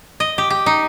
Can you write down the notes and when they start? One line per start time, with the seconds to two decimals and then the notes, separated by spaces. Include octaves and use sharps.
0.20 D#5
0.38 G4
0.50 G4
0.66 D#4